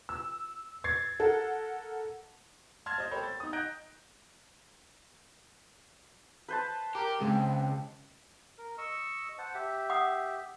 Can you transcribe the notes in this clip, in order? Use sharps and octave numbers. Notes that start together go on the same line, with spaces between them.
E6
G#6 A6 C7
A4 A#4 F#5
A5 C6 F6 G#6 A6
C5 D#5
A4 A#4 C5 C#5 G5 B5
A6
D#4 D#6
D#5 A#5 F#6 G6 A#6 D7
B4 C5 A5
G4 A#4
C#2 G#3 C4
A#4
D#5 C#6 E6
C5 F#5 A5
G4 E5
F#5 D#6